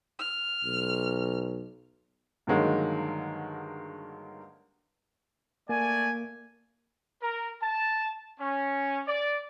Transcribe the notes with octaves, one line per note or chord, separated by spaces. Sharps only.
F6
B1
G2 D3 D#3 F#3 G#3 A#3
A3 A#3 D5 G#5
A#4
A5
C#4
D5